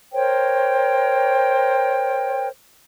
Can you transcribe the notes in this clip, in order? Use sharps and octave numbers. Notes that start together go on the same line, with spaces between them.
A#4 C5 C#5 G5